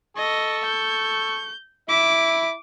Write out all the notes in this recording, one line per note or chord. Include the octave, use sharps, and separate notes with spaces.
A4 D#5 C#6
G6
E4 E5 D6